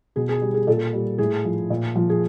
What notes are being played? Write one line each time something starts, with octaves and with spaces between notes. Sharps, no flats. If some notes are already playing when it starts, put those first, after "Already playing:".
B2 G#4
G#4
G3 G4
G#4
A#2 A4
G3
A2 G#4
F3
A#2
F3
G#4